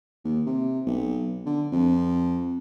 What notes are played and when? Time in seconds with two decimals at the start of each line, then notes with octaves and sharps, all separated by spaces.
0.25 D#2
0.46 C3
0.86 B1
1.46 D3
1.72 F2